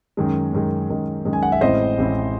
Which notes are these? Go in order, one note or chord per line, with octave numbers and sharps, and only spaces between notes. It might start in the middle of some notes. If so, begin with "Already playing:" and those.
F#2 D#3 G#3
F#2 D#3 G#3
F#2 D#3 G#3
F#2 D#3 G#3
G#5
F#5
E5
A1 A2 G#3 C4 E4 C5 D#5
A1 A2 G#3 C4 E4